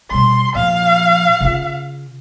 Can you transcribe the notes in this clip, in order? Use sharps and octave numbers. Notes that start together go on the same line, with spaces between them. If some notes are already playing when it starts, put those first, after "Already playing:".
B2 G3 C6
A#2 F3 F5
C#3 F4